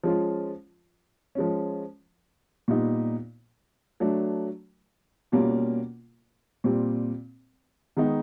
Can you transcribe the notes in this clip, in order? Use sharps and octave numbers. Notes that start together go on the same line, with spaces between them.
F3 G#3 C#4 F4
F3 G#3 C#4
A#2 G3 B3 D#4
F#3 A3 D4
B2 G3 A#3 C#4 F4
A#2 G3 C4
D#3 G#3 B3 D#4